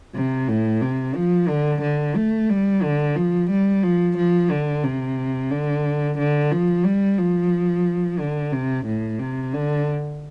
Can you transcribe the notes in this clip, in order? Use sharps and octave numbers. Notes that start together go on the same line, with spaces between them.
C3
A2
C3
F3
D3
D3
A3
G3
D3
F3
G3
F3
F3
D3
C3
D3
D3
F3
G3
F3
D3
C3
A2
C3
D3